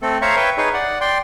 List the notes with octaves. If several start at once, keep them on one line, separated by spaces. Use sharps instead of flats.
A3 C4 A4
C5 C#5 E5 F5 A#5 C#6
B4 C#5 E5 G5
D#4 G#4 B4 C#5
D5 F#5
D5 G5 C6